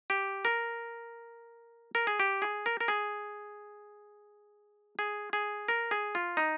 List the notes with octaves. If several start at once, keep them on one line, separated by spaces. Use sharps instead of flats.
G4
A#4
A#4
G#4
G4
G#4
A#4
A#4
G#4
G#4
G#4
A#4
G#4
F4
D#4